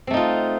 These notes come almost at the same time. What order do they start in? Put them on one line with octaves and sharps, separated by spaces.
C4 A3 D#4 F4